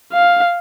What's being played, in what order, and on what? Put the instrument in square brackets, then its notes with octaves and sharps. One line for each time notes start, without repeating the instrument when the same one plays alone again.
[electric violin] F5